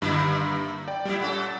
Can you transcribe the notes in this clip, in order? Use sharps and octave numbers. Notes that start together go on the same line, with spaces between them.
G2 D3 A#3 E4
D5 G5
A2 G3 E4
A#2 C#4 A4 F#5